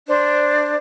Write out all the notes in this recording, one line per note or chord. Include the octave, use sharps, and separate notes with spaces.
D4 C5